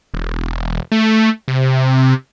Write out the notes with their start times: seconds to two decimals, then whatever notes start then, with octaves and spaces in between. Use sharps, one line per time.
0.14 E1
0.92 A3
1.48 C3